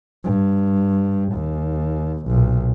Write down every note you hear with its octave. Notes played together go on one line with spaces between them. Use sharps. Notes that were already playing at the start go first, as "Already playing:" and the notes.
G2
D#2
B1 A#2